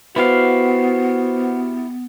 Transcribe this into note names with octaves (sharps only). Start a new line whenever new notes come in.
B3 E4 F#4 G4 B4 C5 F5